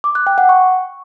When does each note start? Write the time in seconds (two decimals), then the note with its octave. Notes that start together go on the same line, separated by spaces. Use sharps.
0.04 D6
0.15 F#6
0.27 G5
0.38 F#5
0.49 C#6